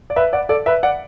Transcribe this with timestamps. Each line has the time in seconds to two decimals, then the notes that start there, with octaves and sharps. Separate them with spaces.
0.10 D5
0.16 B4 E5
0.33 D5 F#5
0.49 A4 D5
0.66 B4 E5
0.83 D5 F#5